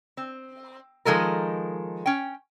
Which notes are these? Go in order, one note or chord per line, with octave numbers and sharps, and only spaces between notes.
C4
D#3 F3 G#3 A4 A#4
C#4 G5